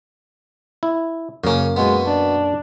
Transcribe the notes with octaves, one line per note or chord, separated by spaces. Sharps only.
E4
F#2 C#3 A#3 C#4
B2 G#3 B3
D4